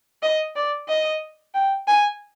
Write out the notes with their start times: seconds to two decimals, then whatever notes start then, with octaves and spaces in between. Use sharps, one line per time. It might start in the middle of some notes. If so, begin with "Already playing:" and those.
0.22 D#5
0.56 D5
0.89 D#5
1.54 G5
1.88 G#5